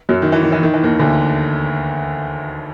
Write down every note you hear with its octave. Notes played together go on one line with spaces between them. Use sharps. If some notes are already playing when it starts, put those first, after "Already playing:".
F#2 F#3
D#3
E3
D#3
E3
D#3
E3
D#2 D#3
D2 D3